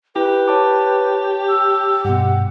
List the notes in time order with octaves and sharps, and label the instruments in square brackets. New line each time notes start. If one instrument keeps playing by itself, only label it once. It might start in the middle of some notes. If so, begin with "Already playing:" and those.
[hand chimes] E4 [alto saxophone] G4 [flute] B4
[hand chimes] C#5 A5 D6
[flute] E6
[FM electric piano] G2 B2 [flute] F#5